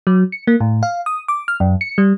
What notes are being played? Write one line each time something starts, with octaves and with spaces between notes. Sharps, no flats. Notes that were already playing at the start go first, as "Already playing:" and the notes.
F#3
C#7
A#3
A2
F5
D#6
D6
F6
F#2
C#7
G3